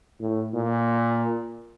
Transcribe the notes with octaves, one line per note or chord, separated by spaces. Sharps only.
A2
A#2